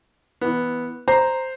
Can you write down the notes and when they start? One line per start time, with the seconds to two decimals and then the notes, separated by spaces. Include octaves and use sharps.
0.41 E3 B3
1.08 C5 A#5